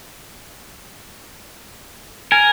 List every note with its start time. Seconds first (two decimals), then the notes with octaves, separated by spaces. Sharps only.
2.32 A#4 G#5